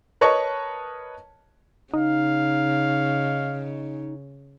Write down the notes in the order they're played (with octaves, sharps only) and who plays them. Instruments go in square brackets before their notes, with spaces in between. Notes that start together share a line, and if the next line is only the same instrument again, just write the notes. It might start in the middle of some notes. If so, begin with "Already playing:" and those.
[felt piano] A#4 B4 C#5 D#5 A5 C#6
[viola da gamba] C#3 [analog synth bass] D#4 [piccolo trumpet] F5